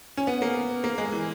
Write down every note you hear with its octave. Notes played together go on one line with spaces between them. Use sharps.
C#4
B3
A#3
A#3
G#3
E3